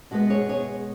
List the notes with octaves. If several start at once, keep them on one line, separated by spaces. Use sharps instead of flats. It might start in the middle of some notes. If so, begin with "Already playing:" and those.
B2 G#3 B3 F#4
G#4 C#5
G#4 C#5